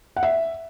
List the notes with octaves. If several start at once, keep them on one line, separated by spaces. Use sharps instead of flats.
F#5
E5